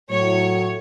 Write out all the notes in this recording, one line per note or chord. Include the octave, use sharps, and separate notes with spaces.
A2 F#3 C#5